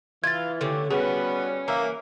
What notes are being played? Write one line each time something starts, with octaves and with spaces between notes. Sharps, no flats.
E3 F4 G#6 A6
D3 A3 C#4 G4
G3 B3 C#4 F#4 G#4 B4
E3 A#3 E5